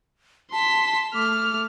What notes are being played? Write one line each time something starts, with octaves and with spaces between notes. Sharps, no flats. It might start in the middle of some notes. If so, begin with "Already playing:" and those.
A5 C6 B6
A3 D6 F6